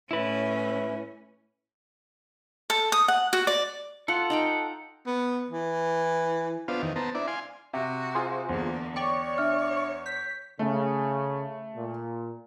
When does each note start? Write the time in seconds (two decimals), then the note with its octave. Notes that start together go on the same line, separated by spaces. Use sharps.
0.11 A2 C#4 E4 B4
2.70 A4
2.92 D#6
3.08 F#5
3.33 F#4
3.47 D5
4.08 F4 A4 F#5
4.30 D#4 F5 G5
5.06 B3
5.50 E3
6.68 B3 D4 F4 C5 F5
6.82 E2 D#3
6.96 B3 C5 A5 A#5
7.15 D4 E4 D5
7.28 F5 G#5 C6
7.74 C3 F#4
8.15 F4 G#4 C5
8.49 E2 D3 A#3
8.96 C#5 D5 G5 C#6
9.38 D4 E5 F6
10.06 G6 B6
10.59 C#3 A3
11.76 A#2